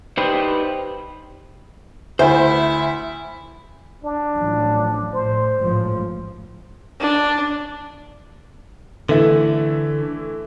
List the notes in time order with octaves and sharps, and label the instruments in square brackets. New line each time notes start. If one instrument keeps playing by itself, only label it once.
[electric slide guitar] D#4 G4 B4 C5 D5
[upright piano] D2 [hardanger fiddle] E4 [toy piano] G4 E5 [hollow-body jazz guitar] C5
[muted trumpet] D4
[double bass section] A1 F3 F#3
[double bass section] A2 [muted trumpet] C5
[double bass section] A1 G#2 F3
[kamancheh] D4
[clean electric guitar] D3 [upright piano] E3 A3 E4